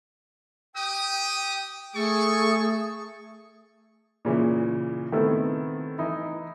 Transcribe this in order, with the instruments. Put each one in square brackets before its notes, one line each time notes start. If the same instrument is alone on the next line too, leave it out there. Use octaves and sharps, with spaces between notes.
[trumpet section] G4 D#6 [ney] G5
[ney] A3 [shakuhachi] G#4 [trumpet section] A4 C#6
[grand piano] A#2 C#3 E3
D#3 A3 B3 C4 E4 A4
E3 D#4 E4